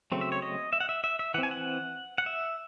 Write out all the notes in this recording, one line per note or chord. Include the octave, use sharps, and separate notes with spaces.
C#3 F#3 A3 C4
E5
C#5
D#5
E5
F#5
E5
E5
E5
E3 C4 F#5
G#5
F#5
F#5
E5